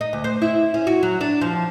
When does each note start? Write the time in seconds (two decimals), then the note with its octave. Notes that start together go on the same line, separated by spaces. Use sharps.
0.01 D#4
0.13 D2
0.24 C5
0.42 E4
0.74 C#4
0.87 F#4
1.03 F#3
1.21 D4
1.41 F3